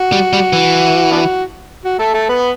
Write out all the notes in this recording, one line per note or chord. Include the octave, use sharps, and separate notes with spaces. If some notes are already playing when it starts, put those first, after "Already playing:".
Already playing: F#4
G3
G3
E3
B3 D4 F#4
F#4
A3 A4
A3 A4
B3 B4